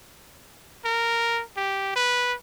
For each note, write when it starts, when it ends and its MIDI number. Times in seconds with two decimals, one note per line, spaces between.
0.85 1.43 70
1.57 1.94 67
1.96 2.34 71